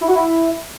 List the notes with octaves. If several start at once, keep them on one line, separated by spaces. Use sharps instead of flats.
E4
F#4
E4